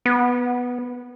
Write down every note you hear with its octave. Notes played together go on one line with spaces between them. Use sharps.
B3